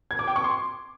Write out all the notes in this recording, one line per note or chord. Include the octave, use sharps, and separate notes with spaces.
G#6
D6
G5
C#6
C6